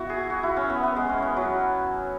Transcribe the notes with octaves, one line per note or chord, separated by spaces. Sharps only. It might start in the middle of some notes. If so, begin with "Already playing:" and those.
Already playing: B3 E4 F#4
G#4
F#4
E4
C#4
B3
B3
G#3
C#4
B3
F#3